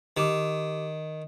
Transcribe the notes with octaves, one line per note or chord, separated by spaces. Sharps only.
D#3 G4 D6